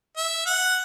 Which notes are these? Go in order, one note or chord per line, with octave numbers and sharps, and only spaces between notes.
E5
F#5